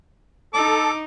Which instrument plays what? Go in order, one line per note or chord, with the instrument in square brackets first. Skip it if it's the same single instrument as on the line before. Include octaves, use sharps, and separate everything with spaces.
[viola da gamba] D#4 [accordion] A4 [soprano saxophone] D6